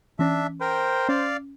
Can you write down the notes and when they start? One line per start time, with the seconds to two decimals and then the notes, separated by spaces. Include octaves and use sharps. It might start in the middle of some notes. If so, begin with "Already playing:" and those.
0.19 E3 C#4 D4 E5
0.61 A#4 C5 G5
1.09 C#4 D5 F5